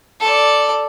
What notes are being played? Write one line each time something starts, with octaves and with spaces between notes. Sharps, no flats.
A4 D5